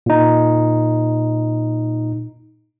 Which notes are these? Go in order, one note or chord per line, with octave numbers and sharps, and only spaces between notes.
A#2 D#4